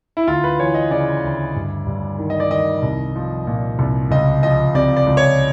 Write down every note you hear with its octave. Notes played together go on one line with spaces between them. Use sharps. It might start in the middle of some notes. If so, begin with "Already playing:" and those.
E4
D2 F4
B4
E3 C#5
D#5
C#3 D5
D2
G2
G2
D#3
D#5
D5
D#3 D#5
C2
F3
A#2
C2
C#2 D#5
F3 D#5
C3 D5
D5
C#2
C#5